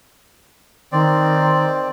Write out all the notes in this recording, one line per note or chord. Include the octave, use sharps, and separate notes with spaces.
D#3 C4 D5